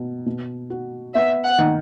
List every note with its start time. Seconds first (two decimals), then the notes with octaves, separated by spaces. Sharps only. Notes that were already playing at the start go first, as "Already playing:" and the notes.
Already playing: B2
0.26 B2
0.70 F#4
1.15 B3 E5
1.44 F#5
1.59 D#3